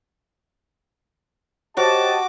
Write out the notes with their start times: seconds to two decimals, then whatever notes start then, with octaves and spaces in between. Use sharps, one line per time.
1.77 F#4 G4 C5 C#5 D#5 A5 D6